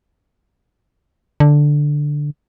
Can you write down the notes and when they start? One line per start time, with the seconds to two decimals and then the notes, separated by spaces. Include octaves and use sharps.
1.40 D3